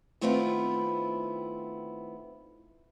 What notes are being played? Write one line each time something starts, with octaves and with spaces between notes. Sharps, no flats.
D#3 A3 B3 C4 E4 F4